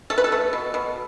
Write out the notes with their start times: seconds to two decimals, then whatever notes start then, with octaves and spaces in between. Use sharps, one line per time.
0.10 A3 A4
0.18 B4
0.24 A4
0.32 A3
0.53 B2
0.74 B2